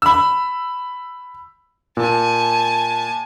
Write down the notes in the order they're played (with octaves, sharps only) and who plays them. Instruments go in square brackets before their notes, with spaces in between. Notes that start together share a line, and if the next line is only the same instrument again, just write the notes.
[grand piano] B5 E6
[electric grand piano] A#2 [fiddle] G#5 A5